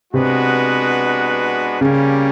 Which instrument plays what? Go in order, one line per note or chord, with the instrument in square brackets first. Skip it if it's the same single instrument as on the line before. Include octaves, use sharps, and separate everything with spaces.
[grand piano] C3 [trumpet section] G#3 B3 D4 F#4 B4
[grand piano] C#3 [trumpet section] G3 A#3 C#4